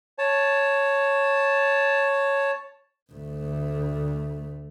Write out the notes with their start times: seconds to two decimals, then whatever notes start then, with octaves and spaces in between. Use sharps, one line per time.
0.18 C#5 A5
3.12 D2 A3